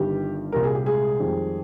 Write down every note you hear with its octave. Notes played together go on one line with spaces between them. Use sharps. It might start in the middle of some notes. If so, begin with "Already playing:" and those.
Already playing: G1 G2 D#3 G3 G4
C2 A#2 G3 A#4
G#4
G4
G#3 G#4
F2 D#3 G3